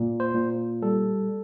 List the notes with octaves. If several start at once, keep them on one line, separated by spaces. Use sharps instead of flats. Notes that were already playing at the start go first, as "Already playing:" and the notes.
Already playing: A#2
C5
A#2
G3 A4